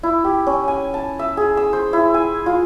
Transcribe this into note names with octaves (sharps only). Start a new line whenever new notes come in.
E4
G4
C#4
G#5
A5
E5
G#4
E6
C5
E4
G#5
F4